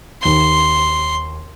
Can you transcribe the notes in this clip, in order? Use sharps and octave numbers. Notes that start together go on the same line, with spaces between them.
D#2 C6 G7